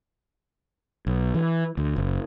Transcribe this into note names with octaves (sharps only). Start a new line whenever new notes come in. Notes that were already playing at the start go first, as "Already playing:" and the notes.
B1
E3
D2
F#1